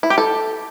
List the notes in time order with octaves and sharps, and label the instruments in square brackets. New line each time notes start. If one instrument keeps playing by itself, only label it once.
[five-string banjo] E4
G4
A4